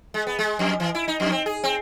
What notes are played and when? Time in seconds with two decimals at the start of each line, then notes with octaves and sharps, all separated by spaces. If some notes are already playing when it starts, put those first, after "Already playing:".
0.14 G#3
0.27 B3
0.39 G#3
0.59 F2
0.80 E3
0.95 E4
1.08 D#4
1.20 F2
1.32 C4
1.46 G#4
1.64 C4